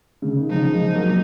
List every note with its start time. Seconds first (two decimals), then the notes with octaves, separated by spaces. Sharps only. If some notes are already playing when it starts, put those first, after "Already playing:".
0.22 C#3
0.37 D#3
0.50 C#3 F3 D#4
0.72 F3 G#3
0.94 F#3 A#3